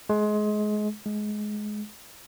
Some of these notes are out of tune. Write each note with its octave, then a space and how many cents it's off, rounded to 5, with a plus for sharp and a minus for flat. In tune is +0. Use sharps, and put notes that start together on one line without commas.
G#3 +25
G#3 +20